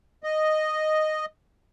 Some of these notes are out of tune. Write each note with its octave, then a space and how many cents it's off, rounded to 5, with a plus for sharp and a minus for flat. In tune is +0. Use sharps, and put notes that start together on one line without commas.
D#5 -5